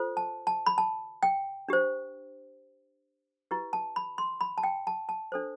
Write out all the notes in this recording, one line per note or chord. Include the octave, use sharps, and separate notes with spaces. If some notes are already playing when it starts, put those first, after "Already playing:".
Already playing: F4 A4 C5
A5
A5
B5
A5
G5
D4 G4 C5
E4 G4 B4
A5
B5
C6
B5
A5
G5
A5
A5
D4 A4 C5